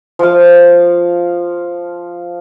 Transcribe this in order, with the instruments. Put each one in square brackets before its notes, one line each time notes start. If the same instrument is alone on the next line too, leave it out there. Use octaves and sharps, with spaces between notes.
[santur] F3 F5